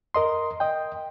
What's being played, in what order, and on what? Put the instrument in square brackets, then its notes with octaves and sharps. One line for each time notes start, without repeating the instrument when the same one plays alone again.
[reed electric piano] A#4 D#5 C6
D#5 G5